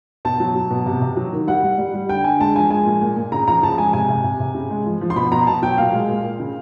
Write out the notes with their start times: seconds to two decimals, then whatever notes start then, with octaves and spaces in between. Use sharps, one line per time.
0.25 B2 A5
0.40 F#3
0.55 F#3
0.71 B2
0.86 C3
1.01 C3
1.17 F#3
1.33 D#3
1.47 G3 F#5
1.63 G3
1.78 G3
1.94 G3
2.09 D3 G5
2.24 D3 G#5
2.40 G#3 A5
2.55 F3 G#5
2.70 G#3 G#5
2.85 A#2
3.01 A#2
3.16 A#2
3.32 C#3 A#5
3.48 F3 A#5
3.63 C#3 A5
3.78 G#3 G#5
3.93 C3 G#5
4.09 C3
4.24 C3
4.40 C3
4.55 C#3
4.70 G#3
4.86 F3
5.01 F3
5.10 C6
5.16 B2 B5
5.32 B2 A#5
5.47 B2 A5
5.62 F#3 G5
5.78 A#2 F5
5.93 G#3
6.09 A#2
6.24 A#2
6.40 C#3